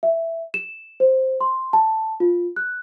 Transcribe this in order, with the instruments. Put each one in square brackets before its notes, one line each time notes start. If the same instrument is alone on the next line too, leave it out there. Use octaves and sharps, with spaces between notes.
[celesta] E5
E7
C5
C6
A5
F4
F#6